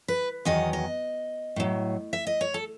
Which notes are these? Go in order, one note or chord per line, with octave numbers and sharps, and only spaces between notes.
B4
E2 D#3 F#3 D#5
D#5
A2 F#3
E5
D#5
C#5
A4